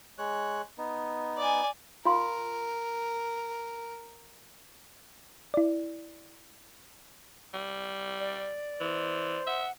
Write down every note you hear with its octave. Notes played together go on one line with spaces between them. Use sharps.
G#3 C#5 F#6
B3 D#4
D5 G#5
F4 A#4 F5 C6
E4 D5
G3
D5
E3 C5
E5 F#5